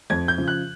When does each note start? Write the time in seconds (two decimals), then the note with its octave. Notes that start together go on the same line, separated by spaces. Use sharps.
0.10 F2 G#6
0.28 G6
0.38 C#3 F3
0.48 F#6